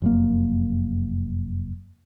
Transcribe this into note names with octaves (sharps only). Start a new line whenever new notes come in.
F1 F#2 A#3